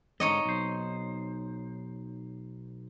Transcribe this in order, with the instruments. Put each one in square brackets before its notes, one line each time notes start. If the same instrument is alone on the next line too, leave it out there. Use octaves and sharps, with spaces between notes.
[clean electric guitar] G#2 D3 [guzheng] D#4 C#5 D#5
[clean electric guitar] B1 C5